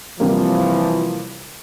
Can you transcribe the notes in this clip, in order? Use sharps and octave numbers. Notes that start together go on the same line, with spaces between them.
C3 E3 F3 G3 A#3